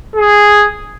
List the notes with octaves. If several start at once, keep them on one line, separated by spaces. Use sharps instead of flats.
G#4